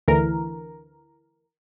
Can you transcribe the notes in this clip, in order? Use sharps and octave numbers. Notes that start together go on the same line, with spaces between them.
D2 D3 E3 A#4